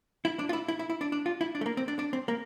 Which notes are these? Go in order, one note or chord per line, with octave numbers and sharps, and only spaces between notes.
E4
D4
F4
E4
E4
E4
E4
D4
D4
F4
E4
D4
A3
A#3
C4
D4
D4
C4
A#3